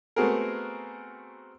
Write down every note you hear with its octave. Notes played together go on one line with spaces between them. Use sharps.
A3 B3 C4 F#4 G#4 A#4